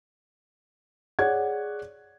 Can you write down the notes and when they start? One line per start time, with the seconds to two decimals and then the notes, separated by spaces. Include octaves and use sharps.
1.19 G#4 C#5 D5 F#5 G#6